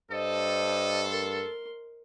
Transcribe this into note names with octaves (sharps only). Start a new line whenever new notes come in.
G2 A4 C5 D#5
A#4 C6